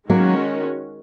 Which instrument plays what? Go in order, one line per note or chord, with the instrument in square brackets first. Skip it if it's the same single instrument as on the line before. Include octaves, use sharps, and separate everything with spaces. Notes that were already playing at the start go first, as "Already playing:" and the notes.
[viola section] D#3 G#3 C#4 F#4 [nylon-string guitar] F#3 A#3